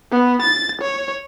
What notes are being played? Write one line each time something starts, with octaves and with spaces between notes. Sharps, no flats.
B3
A6
C#5